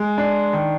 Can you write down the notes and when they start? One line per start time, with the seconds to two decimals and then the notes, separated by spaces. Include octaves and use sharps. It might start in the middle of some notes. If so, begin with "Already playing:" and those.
Already playing: G#3
0.18 D4
0.53 D#3